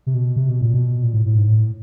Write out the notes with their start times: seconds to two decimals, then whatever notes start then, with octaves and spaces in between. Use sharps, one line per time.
0.06 C3
0.14 B2
0.36 C3
0.49 B2
0.61 A#2
0.74 B2
1.03 A#2
1.14 A2
1.26 A2
1.37 G#2
1.48 A2